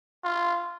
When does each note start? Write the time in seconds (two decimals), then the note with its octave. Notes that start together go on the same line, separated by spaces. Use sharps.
0.24 F4